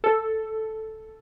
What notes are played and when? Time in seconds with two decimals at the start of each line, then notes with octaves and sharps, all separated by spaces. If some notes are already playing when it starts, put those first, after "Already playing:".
0.04 A4